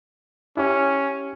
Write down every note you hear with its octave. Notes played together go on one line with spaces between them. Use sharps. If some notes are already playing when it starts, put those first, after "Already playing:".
C#4 E4 G4 C#5